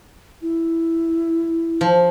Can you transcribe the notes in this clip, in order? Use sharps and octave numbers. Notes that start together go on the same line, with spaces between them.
E4
F3